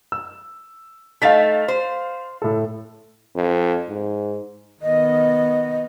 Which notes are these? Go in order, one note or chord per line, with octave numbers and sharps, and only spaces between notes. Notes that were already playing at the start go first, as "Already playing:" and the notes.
E6
A3 D#4 F5 A6 B6
C5
A2 A4
F2
G#2
D#3 B3 D#5